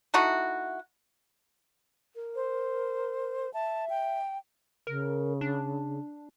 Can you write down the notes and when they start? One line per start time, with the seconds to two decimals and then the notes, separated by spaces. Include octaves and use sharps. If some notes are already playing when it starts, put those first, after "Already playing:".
0.14 A3 D#4 E4 F#4
2.16 A#4
2.35 C5
3.54 E5 A5
3.90 G5
4.87 C#3 A#4
5.41 D4